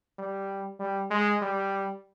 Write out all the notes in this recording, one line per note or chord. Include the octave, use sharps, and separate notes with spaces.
G3
G3
G#3
G3